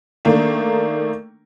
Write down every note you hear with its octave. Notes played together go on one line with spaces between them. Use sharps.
D#3 A3 A#3 D4